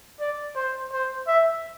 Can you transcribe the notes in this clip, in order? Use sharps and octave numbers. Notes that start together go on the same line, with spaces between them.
D5
C5
C5
E5